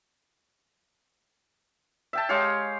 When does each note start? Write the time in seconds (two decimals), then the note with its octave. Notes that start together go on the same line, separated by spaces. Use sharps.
2.13 E5 G5 A5
2.29 G#3 G4 C#5 F5